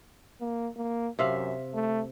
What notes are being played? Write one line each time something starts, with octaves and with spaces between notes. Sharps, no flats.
A#3
A#3
F#2 C3 E5 F5
A3